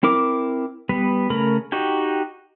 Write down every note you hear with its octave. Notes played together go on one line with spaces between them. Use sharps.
C4 E4 A#4 D6
G3 B3 B4
C#3 A3 A#4 B5
D#4 F#4 G4 G5